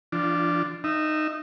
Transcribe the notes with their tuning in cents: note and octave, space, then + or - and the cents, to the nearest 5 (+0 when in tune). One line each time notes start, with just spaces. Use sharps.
F3 -35 D4 +0 F4 -5
D#4 -10 E5 +10